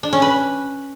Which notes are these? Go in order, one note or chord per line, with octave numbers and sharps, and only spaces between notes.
D4
C#4
B4